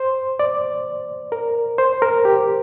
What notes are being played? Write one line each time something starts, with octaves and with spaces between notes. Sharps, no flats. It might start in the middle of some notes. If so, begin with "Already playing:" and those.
Already playing: C5
D5
A#4
C5
A#4
G4